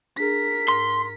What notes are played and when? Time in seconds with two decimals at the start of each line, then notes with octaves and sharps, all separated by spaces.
0.17 D4 G#4 A#4 B6
0.68 G#2 C6